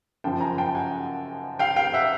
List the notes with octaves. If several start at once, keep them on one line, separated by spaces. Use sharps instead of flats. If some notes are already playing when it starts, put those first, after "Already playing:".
F#2 C#3 F3 G5 A5
G#5 A#5
G5 A5
F#5 G#5
F5 G5
F5 G5
E5 F#5